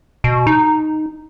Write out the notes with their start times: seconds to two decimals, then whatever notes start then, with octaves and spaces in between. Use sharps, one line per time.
0.24 B2
0.47 D#4